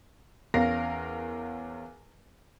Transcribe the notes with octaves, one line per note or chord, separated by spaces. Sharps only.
E2 C#4 A#4 F5 A#6